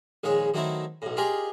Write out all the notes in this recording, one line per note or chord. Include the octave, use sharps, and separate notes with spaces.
A#1 D#3 G#3 C#5
D#3 F#3 A3 C4 D#4 E4
B1 A2
F4 G4 G#4 A#4 D5 D#5